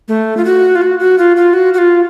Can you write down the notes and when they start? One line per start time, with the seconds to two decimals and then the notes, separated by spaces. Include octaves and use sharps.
0.08 A3
0.37 F4
0.45 F#4
0.75 F4
0.82 F#4
1.00 F#4
1.18 F4
1.37 F4
1.54 F#4
1.74 F#4
1.78 F4